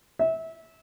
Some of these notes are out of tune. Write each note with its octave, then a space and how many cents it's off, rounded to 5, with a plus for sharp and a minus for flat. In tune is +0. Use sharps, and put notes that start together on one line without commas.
E5 -25